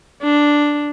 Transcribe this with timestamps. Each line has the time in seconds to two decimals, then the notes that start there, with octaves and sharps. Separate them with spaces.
0.22 D4